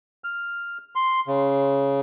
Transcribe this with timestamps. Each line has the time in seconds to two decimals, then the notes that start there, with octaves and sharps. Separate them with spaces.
0.24 F6
0.95 C6
1.27 C#3